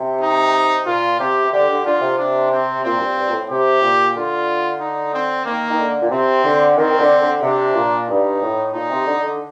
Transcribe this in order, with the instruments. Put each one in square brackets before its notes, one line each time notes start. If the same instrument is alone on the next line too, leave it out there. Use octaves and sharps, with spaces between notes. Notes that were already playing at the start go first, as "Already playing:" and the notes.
Already playing: [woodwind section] C3
[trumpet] D#4
[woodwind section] A#2 [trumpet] F4
[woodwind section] C3 [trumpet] G4
[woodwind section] C3
[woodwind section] D3 [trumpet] G4
[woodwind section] D3
[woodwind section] D3 [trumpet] F4
[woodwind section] C3
[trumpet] D4
C4
[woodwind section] A#2 [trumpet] C4
[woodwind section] G2
G2
A#2
A2
[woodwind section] C3 [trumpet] G4
[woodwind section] A#2
[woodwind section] D3 [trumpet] F4
[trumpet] D#4
C4
[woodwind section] D#3 [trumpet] A#3
[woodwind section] D#3
D3
A#2
[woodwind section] C3 [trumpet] C4
[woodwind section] D3
[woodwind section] D#3 [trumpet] C4
[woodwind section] D#3
D3
D3
[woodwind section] C3 [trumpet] D4
[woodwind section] A#2
[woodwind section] G2 [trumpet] D#4
[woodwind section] A2
[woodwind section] A#2 [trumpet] D#4
[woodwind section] C3
D3
D3